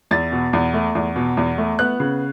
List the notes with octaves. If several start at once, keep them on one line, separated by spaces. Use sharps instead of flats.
E2 A6
B2
E2
A3
E2
B2
E2
A3
B3 F#6
C#3